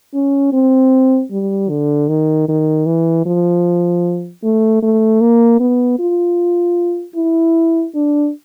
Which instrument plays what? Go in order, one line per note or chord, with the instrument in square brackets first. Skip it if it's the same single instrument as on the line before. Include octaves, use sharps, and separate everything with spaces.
[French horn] C#4
C4
G3
D3
D#3
D#3
E3
F3
A3
A3
A#3
B3
F4
E4
D4